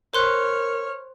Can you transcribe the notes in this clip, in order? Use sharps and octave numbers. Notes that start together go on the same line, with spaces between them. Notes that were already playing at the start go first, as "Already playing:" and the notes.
A#4 C5 C#5 C6 F6 F#6